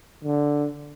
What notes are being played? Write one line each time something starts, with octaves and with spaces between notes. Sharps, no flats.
D3